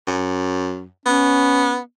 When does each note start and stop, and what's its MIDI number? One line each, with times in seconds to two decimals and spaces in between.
0.07 0.87 42
1.06 1.78 59
1.06 1.77 61